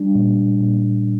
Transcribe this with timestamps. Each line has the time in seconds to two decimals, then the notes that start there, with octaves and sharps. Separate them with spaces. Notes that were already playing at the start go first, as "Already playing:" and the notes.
Already playing: G3 D4
0.15 A#2
0.61 A#2